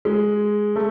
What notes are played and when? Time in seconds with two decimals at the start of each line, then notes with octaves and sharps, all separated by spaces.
0.05 G#3
0.76 A3